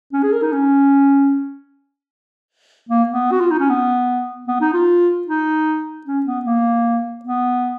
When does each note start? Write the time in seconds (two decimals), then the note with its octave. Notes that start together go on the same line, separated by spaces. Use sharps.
0.13 C#4
0.23 G#4
0.32 A#4
0.42 D#4
0.52 C#4
2.89 A#3
3.09 B3
3.31 F#4
3.40 F4
3.50 D#4
3.59 C#4
3.69 B3
4.48 B3
4.61 D#4
4.73 F4
5.27 D#4
6.06 C#4
6.26 B3
6.45 A#3
7.24 B3